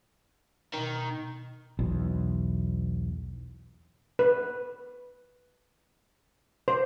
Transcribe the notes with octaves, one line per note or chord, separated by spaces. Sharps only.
B2 D#3
B1 E2
B4
C5